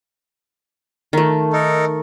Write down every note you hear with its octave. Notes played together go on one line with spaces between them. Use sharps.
D#3 A3
D#4 A4 A#4